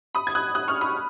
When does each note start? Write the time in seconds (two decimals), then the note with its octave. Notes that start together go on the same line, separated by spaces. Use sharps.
0.15 B5 D#6
0.27 G#6
0.35 D#6 F#6
0.55 D#6 F#6
0.68 C#6 F6
0.81 B5 D#6